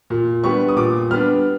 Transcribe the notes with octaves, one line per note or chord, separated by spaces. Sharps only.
A#2
G3 B3 D4 C#6
D#6
A#2 D6
G3 B3 D4 F6